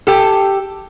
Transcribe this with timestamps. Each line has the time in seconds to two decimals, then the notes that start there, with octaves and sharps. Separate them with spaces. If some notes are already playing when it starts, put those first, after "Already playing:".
0.07 G4 A4